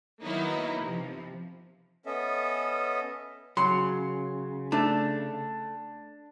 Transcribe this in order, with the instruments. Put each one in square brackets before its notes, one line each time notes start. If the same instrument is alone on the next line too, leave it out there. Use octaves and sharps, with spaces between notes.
[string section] D#3 F#3 A#3 B3 D#4 E4
C3 F3
[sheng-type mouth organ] B3 C#4 A4 D#5 E5
[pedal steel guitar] C#3 [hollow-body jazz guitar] F#3 [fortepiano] C6
[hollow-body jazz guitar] A3 [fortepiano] D4